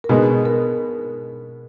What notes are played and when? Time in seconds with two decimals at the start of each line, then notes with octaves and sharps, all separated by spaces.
0.04 A#4
0.09 B2 G#3 B3 D#4 G#4
0.45 A#4